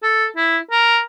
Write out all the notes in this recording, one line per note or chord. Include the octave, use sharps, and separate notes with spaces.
A4
E4
A#4